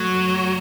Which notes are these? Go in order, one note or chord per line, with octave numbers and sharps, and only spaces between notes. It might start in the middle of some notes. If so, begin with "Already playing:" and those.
Already playing: F#3 A3